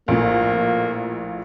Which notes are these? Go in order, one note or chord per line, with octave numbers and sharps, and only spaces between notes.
A#1 A2 A#3